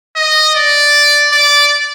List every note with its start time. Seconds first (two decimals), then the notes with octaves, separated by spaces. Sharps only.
0.16 D#5
0.55 D5
1.32 D5